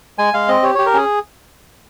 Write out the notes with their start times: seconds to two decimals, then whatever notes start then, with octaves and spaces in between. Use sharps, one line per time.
0.18 G#3 G#5
0.34 G#3 F5
0.48 C4 D#5
0.63 G4 C#5
0.75 G4 C#5
0.86 A#4
0.93 C#4 G#4